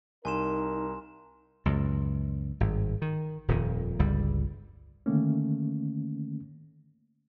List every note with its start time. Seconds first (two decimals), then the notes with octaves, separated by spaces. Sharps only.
0.25 C2 D#4 A#4 G#5 C6 E7
1.66 C#2 F#2
2.60 G#1 G2
3.02 D#3
3.48 D#1 F2 A#2 D#3
3.99 G1 C#2 G3
5.06 D3 D#3 A3 A#3 C#4